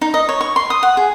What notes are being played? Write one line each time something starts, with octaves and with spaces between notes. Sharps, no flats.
D#4
D#5
C#5
C#6
C6
D#6
F#5
G#4